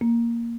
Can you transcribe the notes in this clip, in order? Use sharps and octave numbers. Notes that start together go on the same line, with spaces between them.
A#3